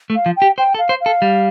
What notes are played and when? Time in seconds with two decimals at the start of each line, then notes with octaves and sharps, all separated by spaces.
0.10 A3
0.15 F5
0.26 F3
0.36 G5
0.42 G4
0.58 C5 G5
0.74 A4
0.79 F5
0.89 C5
1.01 F5
1.06 A4
1.22 G3